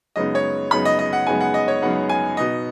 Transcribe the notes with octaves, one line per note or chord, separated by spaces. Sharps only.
F#2 C#3 G#3 B3 D#4 D#5
C#5
F#2 C#3 G#3 B3 D#4 B5
D#5
D#5
F#5
F#2 C#3 G#3 B3 D#4 G#5
F#5
D#5
C#5
F#2 C#3 G#3 B3 D#4 F#5
G#5
B2 B3 D#4 D#5